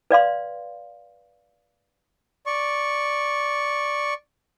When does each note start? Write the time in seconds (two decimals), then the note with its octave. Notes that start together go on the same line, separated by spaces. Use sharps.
0.11 B4 D5 F5 C6
2.47 D5 C#6